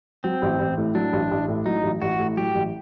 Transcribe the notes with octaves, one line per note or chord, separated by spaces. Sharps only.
F#3 C4
A1
A1
A2
F#3 D4
A1
A1
A2
F#3 D#4
A1
A1 F#4
A2
F#3 G4
A1